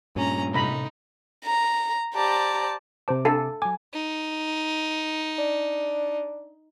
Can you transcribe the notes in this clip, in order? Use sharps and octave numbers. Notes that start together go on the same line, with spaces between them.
G2 A#2 C#4 A#5
A2 C3 D#4 A4 A#5 B5
A#5
G4 C5 D5 A5 A#5
C3 C5 A5 D6
D4 A4 F5 G#5
F#3 G#5 D6
D#4
D4